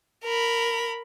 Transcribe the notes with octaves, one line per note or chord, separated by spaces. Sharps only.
A#4 B5